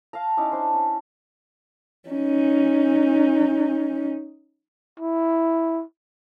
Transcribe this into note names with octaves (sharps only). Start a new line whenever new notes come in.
F5 A5 A#5
C#4 D#4 E4 D5
D4 C5
C#4
C#4 D#4
E4